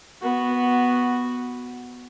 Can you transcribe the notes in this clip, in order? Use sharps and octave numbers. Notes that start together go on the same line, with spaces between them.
B3 F#4